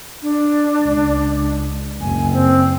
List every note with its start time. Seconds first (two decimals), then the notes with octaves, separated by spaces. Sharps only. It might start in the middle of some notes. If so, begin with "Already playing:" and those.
0.22 D4
0.82 C#2
2.01 F#1 G#5
2.33 C4